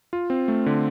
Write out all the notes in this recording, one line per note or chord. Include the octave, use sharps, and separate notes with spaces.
F4
C4
A3
D3